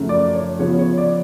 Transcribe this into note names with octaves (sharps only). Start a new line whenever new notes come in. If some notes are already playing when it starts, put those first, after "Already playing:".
Already playing: F#2 C#3 F3 A3
D5
C#5
C#3 F3 B3 F4 C#5
C#5
D5